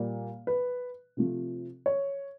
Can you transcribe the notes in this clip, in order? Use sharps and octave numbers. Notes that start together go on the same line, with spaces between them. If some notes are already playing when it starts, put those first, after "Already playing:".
Already playing: A#2 G3 A#3
B4
C3 F3 A3
C#5